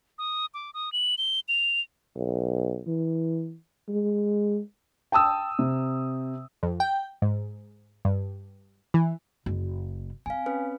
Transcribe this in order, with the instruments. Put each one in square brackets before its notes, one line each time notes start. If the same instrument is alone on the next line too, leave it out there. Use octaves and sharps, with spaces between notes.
[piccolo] D#6
D6
D#6
F#7
G7
F7
[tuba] B1
E3
G#3
[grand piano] G5 A5 D#6 E6
C3
[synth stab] F2
G5
G#2
G2
E3
[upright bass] F#1
[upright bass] C4 [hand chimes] F5 G#5
[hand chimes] C#4 B4